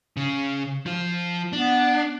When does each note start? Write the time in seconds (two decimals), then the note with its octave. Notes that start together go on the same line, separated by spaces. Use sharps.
0.17 C#3
0.86 F3 F4
1.53 B3 D4